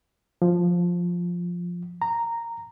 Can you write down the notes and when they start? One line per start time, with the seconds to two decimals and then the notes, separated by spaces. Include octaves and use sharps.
0.42 F3
2.02 A#5